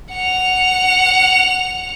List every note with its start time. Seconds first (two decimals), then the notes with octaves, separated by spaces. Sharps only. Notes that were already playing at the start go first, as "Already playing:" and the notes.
0.12 F#5 F7